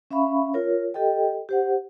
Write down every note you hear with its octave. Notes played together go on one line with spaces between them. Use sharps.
C#4 E5 F5 B5 C#6
F4 A#4 C#5
G4 A4 D#5 G5
G4 C5 F#5